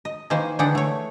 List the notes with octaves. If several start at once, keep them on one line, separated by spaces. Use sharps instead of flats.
D#5
D#3 E3 A#3 C5 G#5
D3 E3 D4 G#4 F#5 G5
A3 C#5